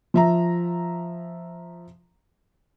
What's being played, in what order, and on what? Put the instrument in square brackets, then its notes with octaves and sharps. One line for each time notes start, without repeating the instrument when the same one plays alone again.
[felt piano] F3 E5 A#5